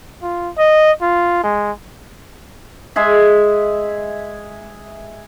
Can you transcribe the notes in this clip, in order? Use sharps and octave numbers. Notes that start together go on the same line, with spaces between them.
F4
D#5
F4
G#3
G#3 G#4 E5